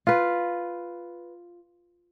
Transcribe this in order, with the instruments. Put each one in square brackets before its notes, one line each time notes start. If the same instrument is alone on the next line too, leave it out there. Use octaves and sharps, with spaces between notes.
[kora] F4 B4